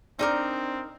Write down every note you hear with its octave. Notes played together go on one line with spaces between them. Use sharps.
C4 D4 D#4 A4 A#4 D5 D6